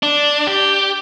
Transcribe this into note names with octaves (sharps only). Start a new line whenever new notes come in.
D4
G4